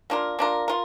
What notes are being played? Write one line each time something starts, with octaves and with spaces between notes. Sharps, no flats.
A#3 D4 F4 A#4
A#3 D4 F4 A#4
F4 A#4